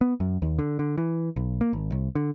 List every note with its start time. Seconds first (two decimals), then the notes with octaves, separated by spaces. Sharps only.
0.01 B3
0.20 F#2
0.42 D#2
0.59 D3
0.79 D3
0.98 E3
1.36 B1
1.61 A#3
1.73 G#1
1.92 C2
2.15 D3